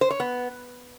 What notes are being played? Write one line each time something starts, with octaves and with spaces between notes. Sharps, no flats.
C5
C#5
B3